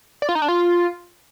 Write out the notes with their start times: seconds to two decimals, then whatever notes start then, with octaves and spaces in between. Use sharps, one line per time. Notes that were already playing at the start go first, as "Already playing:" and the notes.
0.22 D5
0.29 F4
0.35 D#4
0.42 D4
0.48 F4